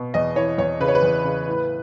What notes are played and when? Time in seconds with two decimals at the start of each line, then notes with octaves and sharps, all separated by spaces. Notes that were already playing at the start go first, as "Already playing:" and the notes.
Already playing: B2
0.14 E2 D#5
0.36 E3 C#5
0.58 E2 C#5
0.80 C#3 B4
0.88 C#5
0.95 B4
1.03 E2
1.24 C#3
1.47 A2